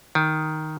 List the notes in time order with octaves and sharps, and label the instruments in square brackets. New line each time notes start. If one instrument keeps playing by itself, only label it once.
[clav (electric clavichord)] D#3